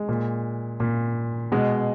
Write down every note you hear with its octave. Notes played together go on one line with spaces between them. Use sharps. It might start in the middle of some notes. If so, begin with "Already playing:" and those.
Already playing: G#3
A#2
A#2
B2 G#3